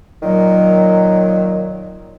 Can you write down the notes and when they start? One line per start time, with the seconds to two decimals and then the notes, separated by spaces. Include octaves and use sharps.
0.23 A#2 D#3 F#3